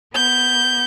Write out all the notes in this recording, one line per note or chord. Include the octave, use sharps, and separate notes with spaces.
B3 G6